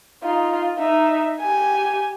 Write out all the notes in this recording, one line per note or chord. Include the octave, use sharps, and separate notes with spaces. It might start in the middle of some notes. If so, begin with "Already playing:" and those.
D#4 F4
D#4 E5
G4 G#5